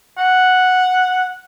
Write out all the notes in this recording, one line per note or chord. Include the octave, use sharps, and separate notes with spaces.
F#5